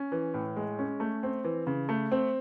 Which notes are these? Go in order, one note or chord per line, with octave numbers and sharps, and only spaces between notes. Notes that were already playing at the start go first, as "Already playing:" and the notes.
Already playing: C#4
E3
A2
G#3
C#4
A3
C4
E3
C#3
A3
C4